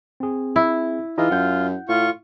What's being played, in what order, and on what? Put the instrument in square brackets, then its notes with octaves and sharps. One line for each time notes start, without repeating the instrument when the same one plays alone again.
[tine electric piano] C4 G#4
[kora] E4
[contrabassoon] E3 [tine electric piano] D#4 G#4 D#5 [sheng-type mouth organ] F4
[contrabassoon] F#2 [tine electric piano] F#5 G6
[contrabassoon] A2 [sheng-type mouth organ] F4 C#6